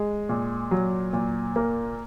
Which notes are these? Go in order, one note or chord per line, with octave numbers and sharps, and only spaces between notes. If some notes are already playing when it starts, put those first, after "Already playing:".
Already playing: G#3
A#2
F#3
A#2
A#3